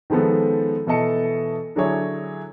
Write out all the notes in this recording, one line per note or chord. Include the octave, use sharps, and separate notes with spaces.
D#3 F3 G#3 B3 A4
B2 E3 A4 D#5 A5 C#7
D3 F#3 D4 E4 G#4 C#5